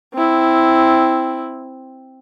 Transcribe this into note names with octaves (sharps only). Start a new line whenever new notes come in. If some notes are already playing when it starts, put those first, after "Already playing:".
C4 E4